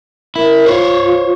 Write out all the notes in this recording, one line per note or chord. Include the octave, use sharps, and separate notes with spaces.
E4 A#4
F4 C5 C#5